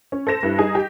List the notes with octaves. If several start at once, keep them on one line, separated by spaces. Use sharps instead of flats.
C#4
A4 C5 A#6 E7
G2 E4
G3 D#4 G#4
G4